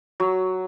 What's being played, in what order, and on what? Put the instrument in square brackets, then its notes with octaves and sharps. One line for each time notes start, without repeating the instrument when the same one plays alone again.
[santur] F#3